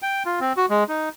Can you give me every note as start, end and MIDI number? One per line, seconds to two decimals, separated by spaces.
0.02 0.23 79
0.25 0.40 65
0.40 0.53 60
0.57 0.66 66
0.70 0.84 56
0.88 1.09 63